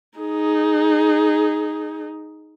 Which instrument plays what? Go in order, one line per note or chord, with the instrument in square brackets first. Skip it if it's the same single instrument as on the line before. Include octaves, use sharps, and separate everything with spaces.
[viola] D#4 G#4